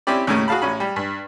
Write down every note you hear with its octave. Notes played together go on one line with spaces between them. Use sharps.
C4 C#4 E4 G4 D5
D#2 A2 C#3 C#4
F#4 G#4 F5 A5 B5
A1 C#4 B5
G3
G2